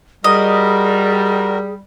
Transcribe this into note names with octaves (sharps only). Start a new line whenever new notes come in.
G3 F#4 G#4 A#4 D#5